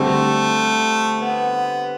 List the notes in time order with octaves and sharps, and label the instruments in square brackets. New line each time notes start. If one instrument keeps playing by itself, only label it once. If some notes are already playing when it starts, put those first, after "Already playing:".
Already playing: [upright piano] D3 G3 C4 G4 [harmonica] A3
[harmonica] B3